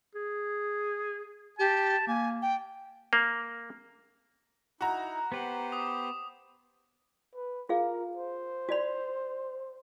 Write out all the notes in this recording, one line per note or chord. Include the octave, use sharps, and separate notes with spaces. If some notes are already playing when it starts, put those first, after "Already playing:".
G#4
G4 A5
A#3 G#5
G5
A#3
D#4 E4 F#4 A#5
B3 G4 B4 C5 F#5
D6 D#6
B4
F4 G#4 A#4 F5
C5
F#4 D5 B5